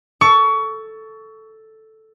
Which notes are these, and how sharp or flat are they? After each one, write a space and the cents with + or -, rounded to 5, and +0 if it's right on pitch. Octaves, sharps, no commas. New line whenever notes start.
A4 +0 C#6 +25